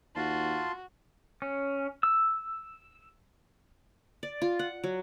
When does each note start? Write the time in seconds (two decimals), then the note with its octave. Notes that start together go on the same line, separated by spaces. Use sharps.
0.16 D#2 F4 F#4 A5 C6
1.42 C#4
2.03 E6
4.23 D5
4.42 F4
4.59 F#5
4.84 F#3